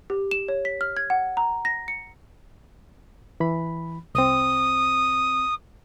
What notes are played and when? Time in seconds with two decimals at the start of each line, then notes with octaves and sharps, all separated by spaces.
0.10 G4
0.31 E7
0.48 C#5
0.65 B6
0.81 F6
0.97 G#6
1.10 F#5
1.37 A#5
1.65 A#6
1.88 C#7
3.40 E3 B5
4.15 C2 C4 D#6